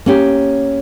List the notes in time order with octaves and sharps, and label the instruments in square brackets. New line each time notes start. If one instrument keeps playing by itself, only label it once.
[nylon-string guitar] A#3 C#4 G4